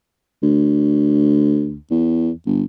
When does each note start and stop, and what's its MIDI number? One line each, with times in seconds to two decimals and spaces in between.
0.43 1.76 38
1.91 2.30 40
2.46 2.63 31